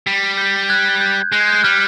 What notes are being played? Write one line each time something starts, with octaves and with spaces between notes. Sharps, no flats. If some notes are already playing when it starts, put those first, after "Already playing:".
G3
G6
F#6 G#6
G6
G#3 F#6
G#6
G6
F#6
G3 F6